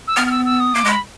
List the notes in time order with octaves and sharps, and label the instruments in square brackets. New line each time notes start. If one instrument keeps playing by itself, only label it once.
[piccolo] E6
[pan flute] B3 [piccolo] F6
[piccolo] F6
E6
E6
D#6
[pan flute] A#3 [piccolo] D6
[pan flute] G#3 [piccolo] B5